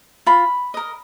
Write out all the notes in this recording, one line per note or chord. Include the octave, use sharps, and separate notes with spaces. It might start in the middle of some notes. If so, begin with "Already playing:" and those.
F4 B5
A#4 D#5